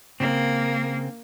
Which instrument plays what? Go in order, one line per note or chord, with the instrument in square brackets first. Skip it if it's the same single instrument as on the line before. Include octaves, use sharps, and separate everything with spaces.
[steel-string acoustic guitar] C#3 [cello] A#3 [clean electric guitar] C4